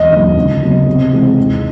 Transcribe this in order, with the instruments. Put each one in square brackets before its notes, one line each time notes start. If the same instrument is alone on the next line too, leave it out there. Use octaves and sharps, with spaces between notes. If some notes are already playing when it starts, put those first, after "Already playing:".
Already playing: [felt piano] E1 [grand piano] D#5
[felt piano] D#2 D3 F#3 A#3
C#2
C#3 F#3 B3
C3
E3 G#3 C4
D#2